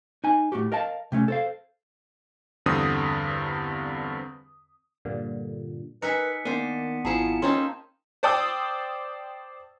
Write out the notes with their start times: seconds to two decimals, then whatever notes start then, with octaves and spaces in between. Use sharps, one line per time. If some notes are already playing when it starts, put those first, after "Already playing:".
0.24 D#4 G#5
0.52 A2 D#4 F#4 G4
0.72 A#4 D#5 F5 A5
1.12 C3 A3 C#4
1.28 A4 C5 F5
2.66 E2 G2 D3 C4 D#6
5.05 G2 A#2 D3
6.02 D#4 A#4 B4 E5 G#5 B6 C#7
6.45 D#3 A#3 B3 D4 C5 D#7
7.05 G#1 F3 E4 G#4 A5 A#5 C#7 E7
7.42 A#3 C4 C#4 D#4 A4 C#5 C6
8.23 C5 D5 G5 A5 D#6 E6